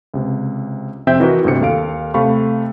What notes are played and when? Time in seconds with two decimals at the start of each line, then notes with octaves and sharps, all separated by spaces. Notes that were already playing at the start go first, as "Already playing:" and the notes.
0.14 C#2 C3
1.07 F2 C3 C4 E5 G5 G6
1.20 E3 D#4 F#4 A#4 B4
1.44 G1 D2 C3 C#7
1.61 D#2 A4 F5 D7
2.14 C3 A3 F5 B5 C#6